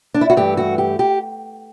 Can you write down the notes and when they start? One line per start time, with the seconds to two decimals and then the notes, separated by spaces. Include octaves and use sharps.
0.14 D4
0.21 E4
0.30 F#4
0.36 G2 E3 A3 G4
0.57 F#4
0.78 G4
0.99 G4